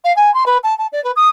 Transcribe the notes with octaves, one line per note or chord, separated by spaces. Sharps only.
F5
G#5
C6
B4
A5
A5
D5
B4
D#6